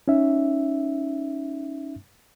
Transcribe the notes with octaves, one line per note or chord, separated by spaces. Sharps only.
C#4 D#4 E5